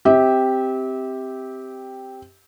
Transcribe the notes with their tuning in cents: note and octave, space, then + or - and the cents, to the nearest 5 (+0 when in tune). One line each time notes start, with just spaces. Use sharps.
C4 +0 G4 +0 E5 -30